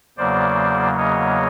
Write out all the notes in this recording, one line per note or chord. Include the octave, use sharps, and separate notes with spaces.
E2 C#3 F#3 A#3 C5 D5
C#5 D#5